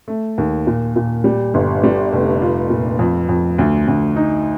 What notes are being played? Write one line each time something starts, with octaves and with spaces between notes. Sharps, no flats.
A3
D#2
A#2
A#2
G3
G1
G3
F1
F4
A#2
F2
F2
D2
D2
D#4